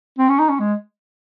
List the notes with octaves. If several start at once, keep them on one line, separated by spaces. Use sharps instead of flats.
C4
C#4
D#4
C#4
G#3